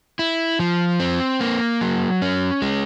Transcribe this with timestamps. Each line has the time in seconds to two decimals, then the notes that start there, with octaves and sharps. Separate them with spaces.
0.19 E4
0.59 F3
1.00 C4
1.41 A#3
1.81 F#3
2.22 C#4
2.62 G#3